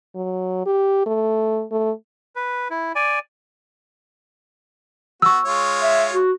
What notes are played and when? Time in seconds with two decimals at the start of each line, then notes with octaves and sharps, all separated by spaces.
0.15 F#3
0.66 G4
1.06 A3
1.72 A3
2.36 B4
2.70 E4
2.95 D5 G#5
5.22 B3 F#4 C#6 E6
5.45 G#3 F4 C#5
5.81 E5
6.13 F#4